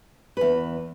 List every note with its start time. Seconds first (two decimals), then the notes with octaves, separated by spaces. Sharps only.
0.37 E2 B4